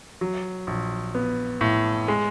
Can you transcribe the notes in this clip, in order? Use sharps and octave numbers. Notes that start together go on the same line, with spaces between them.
F#3
A#1
B3
A2
G#3